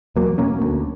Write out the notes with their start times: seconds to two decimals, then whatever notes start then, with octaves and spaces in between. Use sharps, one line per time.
0.16 E2 F#3 A#3
0.38 B2 A#3 C#4
0.62 D2